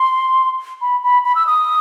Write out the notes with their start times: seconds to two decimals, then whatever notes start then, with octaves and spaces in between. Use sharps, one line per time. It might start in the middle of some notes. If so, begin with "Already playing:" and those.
Already playing: C6
0.81 B5
1.03 B5
1.24 B5
1.35 E6
1.47 D#6